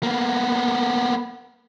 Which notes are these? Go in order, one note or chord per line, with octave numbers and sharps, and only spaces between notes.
A#3 B3